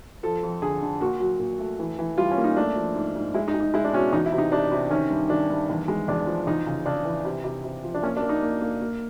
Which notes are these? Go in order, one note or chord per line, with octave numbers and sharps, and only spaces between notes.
F3 A4
F2
D3 G#4
D3
A#2 F#4
F#3
A#2
A3
E3
E3
G3 F4
C#4
A#3
D#4
A3 D4
F3
G#2
G#2
G#3 E4
D#4
G#3
D#4
G#3 E4
D4
B2 C#4
E2 D#4
E4
C3
D#4
C3 D4
C3
D#3 C#4
G2
D#3 D4
G2
E2
G#3
E2 D4
F3
E2 D#4
C#3
C#3 D4
E3
C3
C3
C3
F3
D4
A#3 C#4
D4
A#3
D#4
A#3
A#3
A#3